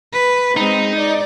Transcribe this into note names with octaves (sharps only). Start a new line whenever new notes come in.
B4
G#3 C4 D#4
D5